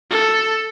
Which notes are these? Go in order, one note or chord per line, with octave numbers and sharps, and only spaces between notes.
A4